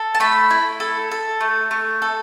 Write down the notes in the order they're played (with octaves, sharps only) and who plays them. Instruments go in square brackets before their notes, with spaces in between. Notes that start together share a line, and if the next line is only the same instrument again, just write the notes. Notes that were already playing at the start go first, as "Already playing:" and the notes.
Already playing: [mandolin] A4
A5
A3 B5
E4
A4
A4
A3
A3
A4